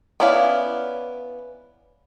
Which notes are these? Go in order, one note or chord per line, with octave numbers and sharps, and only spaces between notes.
B3 C#4 E4 D5 F5